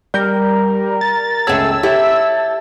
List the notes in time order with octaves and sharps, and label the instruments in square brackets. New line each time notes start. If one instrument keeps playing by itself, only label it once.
[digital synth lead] G3 [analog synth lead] A#4 [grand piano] G6
[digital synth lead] A6
[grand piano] C#2 C#5 [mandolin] A3 G#4 [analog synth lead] A5 [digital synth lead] E6
[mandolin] E4 [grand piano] G4 A4 C#5